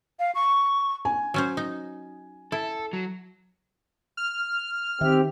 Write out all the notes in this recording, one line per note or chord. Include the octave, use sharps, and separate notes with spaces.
F5
C#6
G#5
F#3 C#4 C5
D#4
E4 A4
F#3
F6
D#3 C4 G4 E5